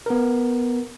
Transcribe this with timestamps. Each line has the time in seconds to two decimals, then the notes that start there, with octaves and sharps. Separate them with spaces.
0.06 B3 A#4